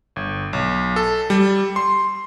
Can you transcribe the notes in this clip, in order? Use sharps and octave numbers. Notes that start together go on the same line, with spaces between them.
G1
B1
A4
G3
C6